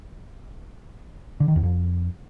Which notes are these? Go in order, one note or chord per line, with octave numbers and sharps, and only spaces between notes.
D3
D#3
E2
F2